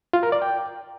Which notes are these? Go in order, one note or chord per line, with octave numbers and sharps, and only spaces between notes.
F4
A#4
D5
G5